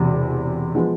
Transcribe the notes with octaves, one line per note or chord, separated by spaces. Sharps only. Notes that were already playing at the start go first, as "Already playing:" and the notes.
Already playing: E1 E2 C3
F3 G#3 B3